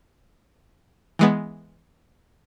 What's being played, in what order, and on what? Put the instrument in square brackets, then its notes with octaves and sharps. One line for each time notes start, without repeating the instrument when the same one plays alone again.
[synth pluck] E3 G#3 B3